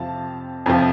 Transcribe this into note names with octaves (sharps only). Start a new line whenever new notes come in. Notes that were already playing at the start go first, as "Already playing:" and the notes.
Already playing: F2 C3 F3 F5 A5
F2 C3 F3